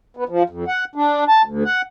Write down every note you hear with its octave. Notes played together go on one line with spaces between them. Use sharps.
B3
F3
F2
F#5
D4
A5
D2
F#5